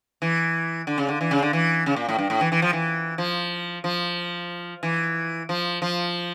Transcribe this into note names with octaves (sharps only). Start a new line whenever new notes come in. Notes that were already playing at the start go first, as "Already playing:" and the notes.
E3
D3
C#3
D3
E3
C#3
D3
E3
C#3
A#2
A2
G2
A2
E3
E3
F3
E3
F3
F3
E3
F3
F3